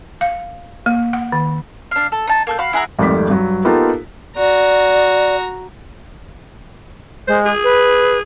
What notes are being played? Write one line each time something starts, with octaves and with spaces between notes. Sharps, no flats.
F5
A#3
F#5
D#3
D4 F5
A4
D#4 A5
A#3 A4 G6
F#4 F5 B5
E4 G#4 F#5 A#5
G#1 F2 G3 A3 D6 B6
G2 F#3
A#3 B3 D#4 F4 G4 A4
F#4 D5 A#5
G#3 C5
G#4
B4